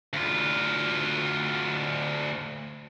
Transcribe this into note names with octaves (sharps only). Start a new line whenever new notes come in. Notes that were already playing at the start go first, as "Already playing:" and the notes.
D2 F4